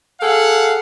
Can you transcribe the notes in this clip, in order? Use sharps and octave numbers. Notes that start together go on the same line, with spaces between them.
G#4 A4 F5 F#5